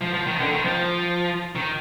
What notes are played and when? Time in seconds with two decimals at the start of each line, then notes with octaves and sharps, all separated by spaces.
0.01 F3
0.14 F3
0.26 D#3
0.40 D3
0.52 D#3
0.65 F3
1.56 D#3